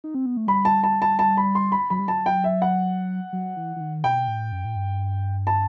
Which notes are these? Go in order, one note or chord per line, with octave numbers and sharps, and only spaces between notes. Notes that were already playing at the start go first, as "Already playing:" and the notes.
D#4
C4
B3
A3
G3 B5
A5
A5
A5
A5
B5
C6
B5
F#3 B5
G3
F#3 A5
G5
E5
F#5
F#3
E3
E3
D#3
B2 G5
A2
F#2
A2
G2
A5